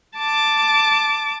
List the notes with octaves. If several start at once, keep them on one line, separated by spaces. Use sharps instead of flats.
A5 D6